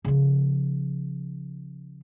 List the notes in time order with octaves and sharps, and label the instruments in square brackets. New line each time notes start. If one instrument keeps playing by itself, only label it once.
[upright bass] C#3 F3